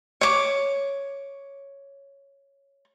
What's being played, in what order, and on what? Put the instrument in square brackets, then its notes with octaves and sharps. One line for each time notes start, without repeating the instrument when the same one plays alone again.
[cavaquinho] C#5 D6